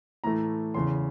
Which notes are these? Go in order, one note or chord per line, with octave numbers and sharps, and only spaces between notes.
A2 E3 A3 A#5
E2 C#3 E3 C6